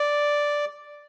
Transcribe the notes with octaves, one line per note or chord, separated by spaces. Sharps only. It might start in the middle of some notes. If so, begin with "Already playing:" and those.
Already playing: D5